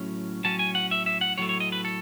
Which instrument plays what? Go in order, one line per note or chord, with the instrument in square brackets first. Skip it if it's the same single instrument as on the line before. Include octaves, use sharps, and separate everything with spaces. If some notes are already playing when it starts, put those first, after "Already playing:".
Already playing: [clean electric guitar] A2 F#3 C#4
A2 F#3 C#4 A5
G#5
F#5
E5
E5
F#5
A2 F#3 A3 C#5
C#5
D#5
B4
A4